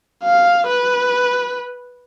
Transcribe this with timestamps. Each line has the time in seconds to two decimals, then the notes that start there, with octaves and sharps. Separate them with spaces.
0.24 F5
0.67 B4